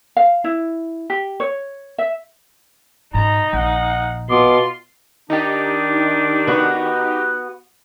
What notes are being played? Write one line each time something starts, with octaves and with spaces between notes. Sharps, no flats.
F5
E4
G4
C#5
E5
G#2 B2 D#4 A#5
A#1 F#5
B2 F4 C6 D6
D#3 D4 D#4 G4
B3 F#4